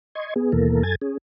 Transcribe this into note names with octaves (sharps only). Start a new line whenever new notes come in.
D#5 C6 C#6 G#6
B3 G#4
D#2 B2 E3 A#3 A4 A#4
F#2 A4 G#5 G#6 A6
C#4 G#4